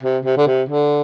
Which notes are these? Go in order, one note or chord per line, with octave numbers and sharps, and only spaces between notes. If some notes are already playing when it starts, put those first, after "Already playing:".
C3
C3
D3
C3
D3